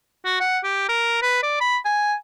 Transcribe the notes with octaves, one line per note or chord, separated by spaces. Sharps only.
F#4
F#5
G4
A#4
B4
D5
B5
G#5